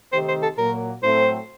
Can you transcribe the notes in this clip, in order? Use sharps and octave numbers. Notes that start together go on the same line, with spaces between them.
C3 D#3 A3 D#4 G4 C5
C5
A4
A#2 F#3 A#3 A#4
A2 F#3 A3 C4 C5